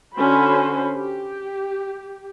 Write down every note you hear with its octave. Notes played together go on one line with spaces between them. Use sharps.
D3 C#4 F#4 C5 B5
G4